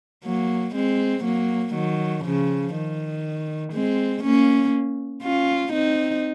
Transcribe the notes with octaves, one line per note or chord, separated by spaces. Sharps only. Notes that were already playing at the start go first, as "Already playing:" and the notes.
F#3 A#3
G#3 C4
F#3 A#3
D#3 F#3
C#3 F3
D#3
G#3 C4
A#3 C#4
C#4 F4
C4 D#4